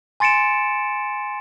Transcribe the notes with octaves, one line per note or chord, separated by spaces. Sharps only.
G#5 C6 A6 C#7 D7 E7